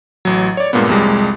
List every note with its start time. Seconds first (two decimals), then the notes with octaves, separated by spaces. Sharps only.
0.25 A1 F#3
0.57 C#5 D5
0.73 G2 A#2 G#3 A#3 B3
0.88 C2 F2 G3 G#3